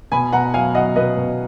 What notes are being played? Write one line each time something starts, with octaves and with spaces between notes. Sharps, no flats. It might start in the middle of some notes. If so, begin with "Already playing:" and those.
B2 G#5 B5
B2 F#5 A#5
F#3 F5 G#5
F#3 D#5 F#5
B2 B4 D#5
B2